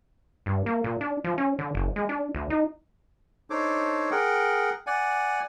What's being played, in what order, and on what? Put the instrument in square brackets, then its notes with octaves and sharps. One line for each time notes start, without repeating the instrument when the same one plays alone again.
[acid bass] G2
A#3
A#2
D4
F3
C#4
D3
F#1
G#3
D4
D2
D#4
[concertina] D4 D#4 A4 C5 C#5 D6
G#4 A#4 F#5 G5
D5 F#5 G#5